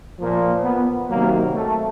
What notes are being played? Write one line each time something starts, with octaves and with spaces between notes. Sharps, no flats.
A#2 F3 A#3
B3
C3 D#3 F#3 A#3
A3